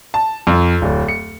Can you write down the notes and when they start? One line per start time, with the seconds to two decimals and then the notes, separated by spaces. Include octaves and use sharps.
0.14 A5
0.47 F2
0.82 D1
1.08 C#7